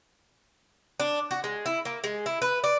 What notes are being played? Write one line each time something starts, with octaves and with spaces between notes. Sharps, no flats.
D4
F#4
G#3
E4
A#3
G#3
E4
B4
D5